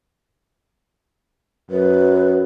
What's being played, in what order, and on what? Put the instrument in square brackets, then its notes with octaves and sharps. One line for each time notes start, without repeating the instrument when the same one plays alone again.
[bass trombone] F#2 [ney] B4